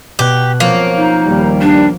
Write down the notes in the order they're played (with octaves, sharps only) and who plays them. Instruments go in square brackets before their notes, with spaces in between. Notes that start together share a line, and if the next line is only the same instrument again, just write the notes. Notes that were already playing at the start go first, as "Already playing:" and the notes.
[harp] B2 F#6 [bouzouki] G4
[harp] F3 C4 C#4 [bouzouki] A#3
[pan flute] D#4
[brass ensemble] D#2 G3
[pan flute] D4